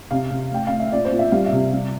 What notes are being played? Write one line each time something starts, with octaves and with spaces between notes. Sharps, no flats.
C3 F5
C3
A3 G5
A3 F5
E5
A#2 D5
C5
A#2
E5
G3 F5
E5
C3
G3